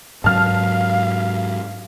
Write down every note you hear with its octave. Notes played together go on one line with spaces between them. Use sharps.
G#2 F#3 F5 A5 F6